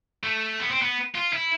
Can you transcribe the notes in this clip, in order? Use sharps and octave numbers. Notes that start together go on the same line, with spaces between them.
A3
B3
C4
B3
F4
E4